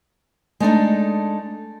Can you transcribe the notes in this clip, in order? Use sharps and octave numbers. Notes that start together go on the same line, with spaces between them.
G#3 A3 D4 D#4